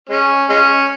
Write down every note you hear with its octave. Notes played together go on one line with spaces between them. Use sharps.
G#3 C#4
G#3 C#4